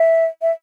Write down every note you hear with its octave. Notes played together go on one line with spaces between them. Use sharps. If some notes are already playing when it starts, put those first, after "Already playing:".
Already playing: E5
E5